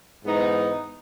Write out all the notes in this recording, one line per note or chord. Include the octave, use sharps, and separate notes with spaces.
G#2 E3 B3 D#4